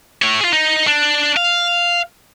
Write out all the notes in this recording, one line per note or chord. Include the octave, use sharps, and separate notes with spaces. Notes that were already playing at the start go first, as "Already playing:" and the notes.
A3 C#5
F4 G#4
D#4
D4
F5